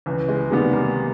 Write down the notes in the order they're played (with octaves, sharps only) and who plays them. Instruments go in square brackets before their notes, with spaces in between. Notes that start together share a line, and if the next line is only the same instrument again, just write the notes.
[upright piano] C#2 [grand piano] E3
[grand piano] G#3
[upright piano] C3 D#3 G3 B3 [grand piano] G#3
[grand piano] A#3